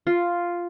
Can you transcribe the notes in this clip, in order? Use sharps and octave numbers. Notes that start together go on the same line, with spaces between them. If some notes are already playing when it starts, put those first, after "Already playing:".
F4